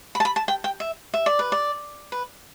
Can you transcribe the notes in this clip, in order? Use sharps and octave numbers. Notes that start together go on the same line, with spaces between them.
B5
A5
B5
A5
G5
G5
E5
E5
D5
B4
D5
B4